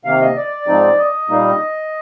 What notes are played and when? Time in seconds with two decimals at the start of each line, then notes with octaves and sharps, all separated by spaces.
0.05 C3 D#3 A#3 F5
0.21 D#5
0.36 D5
0.67 G#2 F3 C4 D#4
0.98 D#5
1.29 A#2 G3 A#3 D#4